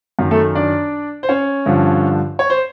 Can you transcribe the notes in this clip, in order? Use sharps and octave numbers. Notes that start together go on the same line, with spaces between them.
F#2 D#3
A3 A4
D4 D5
C5
C#4 C#5
G2 D3 F3
C#5
C5